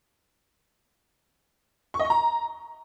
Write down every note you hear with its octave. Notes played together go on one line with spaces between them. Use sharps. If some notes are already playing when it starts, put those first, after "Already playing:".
C#6
D#5
C#6
A#5